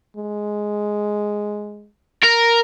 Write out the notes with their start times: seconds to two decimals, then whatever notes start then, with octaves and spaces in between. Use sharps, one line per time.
0.17 G#3
2.24 A#4